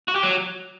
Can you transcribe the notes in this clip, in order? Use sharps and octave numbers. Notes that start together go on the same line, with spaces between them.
F#4
G4
F#3